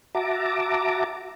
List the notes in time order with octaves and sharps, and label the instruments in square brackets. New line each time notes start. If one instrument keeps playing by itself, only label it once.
[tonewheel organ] F#4 E5 A5 A#5 D6